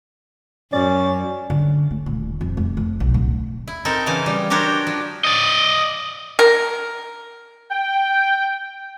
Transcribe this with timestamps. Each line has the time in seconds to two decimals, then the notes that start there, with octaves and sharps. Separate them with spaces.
0.73 F#2 C#4 D5
1.50 D3
1.91 A3
2.06 D#1
2.41 F2
2.57 F1
2.77 F2
3.00 B1
3.14 D1
3.67 E4
3.85 C4 D#4 A4 A#4
4.06 C#3 E3 F5 G#5
4.26 G3
4.50 D4 F#4 G4 A#4 C5 C#5
4.87 F3
5.24 D5 D#5
6.39 A#4
7.71 G5